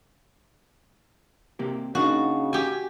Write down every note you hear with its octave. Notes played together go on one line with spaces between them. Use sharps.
C3 A#3 G4
C#3 A#3 D4 D#4 F#4
G4 G#5